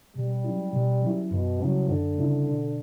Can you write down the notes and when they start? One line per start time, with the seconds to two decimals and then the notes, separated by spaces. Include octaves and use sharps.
0.16 B2 G3
0.44 F#3 C#4 E4
0.73 B2
1.02 F#3 C#4 E4
1.31 F#2 B2
1.60 C#3 F#3 G3 C#4 E4
1.89 F#2 D3
2.18 C#3 G3 C#4 E4
2.47 B2